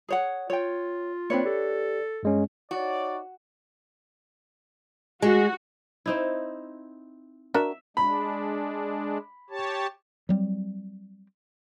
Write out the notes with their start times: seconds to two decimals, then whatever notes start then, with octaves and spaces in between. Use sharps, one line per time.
0.08 G#4 C#5 F#5
0.50 F4 C#5 G5
1.30 A#3 C4 D4 B4 C#5
1.45 G4 A4
2.23 G2 G#3 C#4
2.71 D#4 F#4 C#5 D5
5.22 G#3 F#4
6.06 C4 D#4 E4
7.54 D4 F#4 A#4 E5
7.97 G#3 D4 B5
9.50 G4 C#5 A5
10.29 F#3 G3 C4